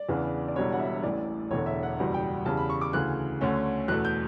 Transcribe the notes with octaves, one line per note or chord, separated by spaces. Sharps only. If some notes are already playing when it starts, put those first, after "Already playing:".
Already playing: D5
E2 C#3 E3 B3 D4
D5
E1 E2 B2 G3 D4 C#5
F#5
E5
A1 A2 E3 D5
E1 E2 D3 C#5
E5
F#5
F#1 E2 B2 G3 F#5
G5
E2 C#3 G3 A5
B5
C#6
D6
D2 C#3 E3 F#6
D2 D3 A3 C#4
E2 B2 A3 F#6
G6